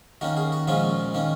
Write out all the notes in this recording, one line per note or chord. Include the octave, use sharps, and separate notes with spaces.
D#3 A#3 C#4 F#4
G#4
F#4
A#2 F3 G#3 C#4 F4
D#3 A#3 C#4